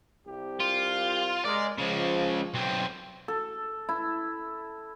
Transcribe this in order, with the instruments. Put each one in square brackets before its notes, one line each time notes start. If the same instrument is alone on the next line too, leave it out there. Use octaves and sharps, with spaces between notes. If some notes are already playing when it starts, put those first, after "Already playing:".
[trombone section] C2 G4
[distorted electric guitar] F4
[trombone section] G#3 A#4 [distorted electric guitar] D5
[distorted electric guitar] C#3 G#3 [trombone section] F3
[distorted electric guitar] B1 C4
[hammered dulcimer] A4
E4